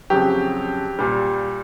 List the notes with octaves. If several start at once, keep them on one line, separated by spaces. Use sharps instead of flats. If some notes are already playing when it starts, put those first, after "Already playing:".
F2 C#3 F#3 G4
A#2 G3